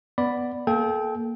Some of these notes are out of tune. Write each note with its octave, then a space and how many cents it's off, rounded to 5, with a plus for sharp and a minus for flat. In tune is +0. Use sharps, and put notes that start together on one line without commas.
B3 +0 D5 +0 B5 +0
A#3 +0 A4 -35 G5 +0